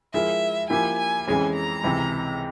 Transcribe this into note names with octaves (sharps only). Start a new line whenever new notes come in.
F3 G#3 E4 A#4 E5
F3 A#3 E4 G4 G#5
G#5
F2 E3 G#3 C#4 G#5
A#5
C#2 C3 E3